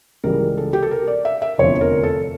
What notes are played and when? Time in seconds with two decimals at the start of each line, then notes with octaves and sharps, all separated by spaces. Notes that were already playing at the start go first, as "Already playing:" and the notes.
0.24 C#2 C#3 E3 G3 A#4
0.57 A4
0.73 G4
0.83 A4
0.91 A#4
1.07 D5
1.25 E5
1.42 E5
1.58 F1 E2 D3 F3 C#5
1.81 A#4
2.03 A4